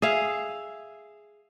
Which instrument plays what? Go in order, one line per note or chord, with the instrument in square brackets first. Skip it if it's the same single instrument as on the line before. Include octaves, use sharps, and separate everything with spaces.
[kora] G#4 E5 F5